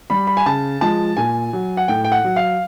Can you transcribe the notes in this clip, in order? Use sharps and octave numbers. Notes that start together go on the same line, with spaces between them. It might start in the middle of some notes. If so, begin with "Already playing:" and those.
G3 B5
B5
G#5
C#3 A5
F3 G#3 A5
A#2 G#5
F#3
F#5
A2 G5
G5
F#5
F#3
F5